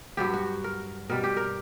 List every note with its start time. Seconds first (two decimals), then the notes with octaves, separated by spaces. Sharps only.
0.17 G2 F#3 G4
0.33 F#4
0.64 A#4
1.09 B2 G3 A#4
1.24 G4
1.37 A#4